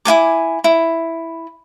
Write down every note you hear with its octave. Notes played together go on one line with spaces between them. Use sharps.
E4 F4 G#5 D6
E4